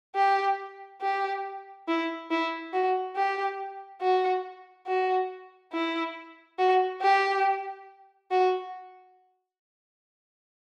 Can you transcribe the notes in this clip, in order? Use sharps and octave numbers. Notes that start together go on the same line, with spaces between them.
G4
G4
E4
E4
F#4
G4
F#4
F#4
E4
F#4
G4
F#4